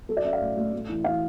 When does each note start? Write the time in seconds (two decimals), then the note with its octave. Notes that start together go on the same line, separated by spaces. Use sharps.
0.09 F#3 A4
0.17 D5
0.25 C#4 E5
0.33 F5
0.41 A2
0.57 A3
0.73 A3
0.89 E3
1.04 E3 F5